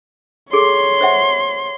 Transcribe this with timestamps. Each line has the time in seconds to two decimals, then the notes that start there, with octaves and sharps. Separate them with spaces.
0.53 G#4 A4 C#5 C6
1.01 C5 E5 F#5